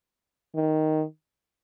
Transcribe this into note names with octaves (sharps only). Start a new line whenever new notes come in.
D#3